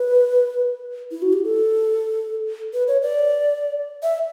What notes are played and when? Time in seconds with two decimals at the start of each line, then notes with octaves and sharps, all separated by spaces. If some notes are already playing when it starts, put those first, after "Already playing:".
Already playing: B4
1.11 E4
1.22 F#4
1.33 G4
1.44 A4
2.73 B4
2.88 C#5
3.02 D5
4.03 E5